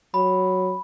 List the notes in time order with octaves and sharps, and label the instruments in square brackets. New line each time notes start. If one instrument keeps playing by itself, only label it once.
[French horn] F#3 [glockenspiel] B5